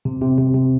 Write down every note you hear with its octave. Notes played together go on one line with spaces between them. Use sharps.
C3
C3
C3
C3